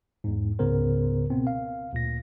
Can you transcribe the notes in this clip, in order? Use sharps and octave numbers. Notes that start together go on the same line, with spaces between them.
E2 G#2
C#2 G#2 C#3 B3 A#4 C5
B2 B3 C4
F5
D2 A#2 A#6